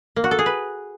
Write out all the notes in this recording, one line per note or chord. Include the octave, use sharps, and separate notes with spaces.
A#3
F#4
A4
G#4
B4